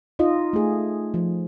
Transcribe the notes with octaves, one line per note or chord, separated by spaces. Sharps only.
D#4 F4 D#5
A3 G#4
F3